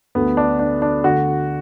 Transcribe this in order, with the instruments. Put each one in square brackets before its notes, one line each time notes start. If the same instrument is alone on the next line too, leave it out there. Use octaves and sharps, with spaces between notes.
[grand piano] D2 D3 B3
D4
D4
D4
D2 D3 F#4